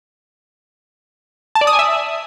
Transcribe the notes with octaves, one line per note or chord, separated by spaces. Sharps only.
A5
D5
D#6
G#5
E5